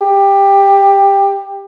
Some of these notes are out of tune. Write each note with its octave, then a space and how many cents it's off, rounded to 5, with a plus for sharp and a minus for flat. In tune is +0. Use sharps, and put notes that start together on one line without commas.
G4 +15